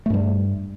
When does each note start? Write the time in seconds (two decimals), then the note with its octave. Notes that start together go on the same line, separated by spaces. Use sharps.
0.06 A3
0.10 G2
0.14 G3